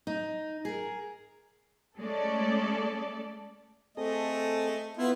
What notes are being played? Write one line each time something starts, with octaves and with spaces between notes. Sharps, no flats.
D#4
G#4 A#4
G#3 A3 C#4 A4 D5
A3 C4 G#4 A4 D#5
B3 E4 F4